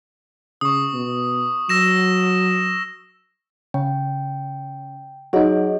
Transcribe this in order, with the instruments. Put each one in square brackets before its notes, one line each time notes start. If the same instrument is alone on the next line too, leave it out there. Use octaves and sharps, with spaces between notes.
[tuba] C#3 [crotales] C#6 D#6
[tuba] B2
[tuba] F#3 [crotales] E6 A#6 E7
[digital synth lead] C#3 [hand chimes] G5
[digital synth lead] F#3 [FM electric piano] D#4 F#4 [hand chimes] G#4 C#5 D#5